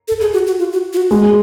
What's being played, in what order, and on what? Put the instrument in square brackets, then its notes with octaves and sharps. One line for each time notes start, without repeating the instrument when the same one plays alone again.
[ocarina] A4
G#4
F#4
F#4
F4
F#4
F4
F#4
[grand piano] G#3 [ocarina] F#4